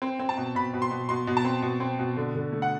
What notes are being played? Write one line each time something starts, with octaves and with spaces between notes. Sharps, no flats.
C4
C4
A5
B2
B2 B5
B2
C6
B2
B2 C6
B2
A5
C4
B2
C4
B2
D3
D3
A3
F#5